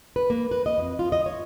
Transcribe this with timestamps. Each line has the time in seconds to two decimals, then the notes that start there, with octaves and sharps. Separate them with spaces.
0.16 B4
0.30 A#3
0.51 B4
0.66 D#5
0.78 F2
0.99 F4
1.12 D#5
1.26 C#5